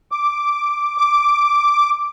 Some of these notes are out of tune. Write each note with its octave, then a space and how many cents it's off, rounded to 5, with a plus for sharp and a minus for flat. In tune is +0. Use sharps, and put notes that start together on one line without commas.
D6 +0
D6 +0